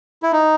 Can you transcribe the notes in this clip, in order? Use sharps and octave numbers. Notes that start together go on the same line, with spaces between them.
E4
D#4